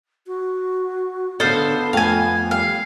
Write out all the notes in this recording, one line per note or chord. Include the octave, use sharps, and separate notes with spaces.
F#4
D3 B3 A4 C5 D#5 F5
F2 A3 F5 G#5
G3 F5